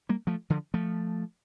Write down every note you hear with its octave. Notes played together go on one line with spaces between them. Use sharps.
G3 A#3
F3 A3
D3 F3
F3 A3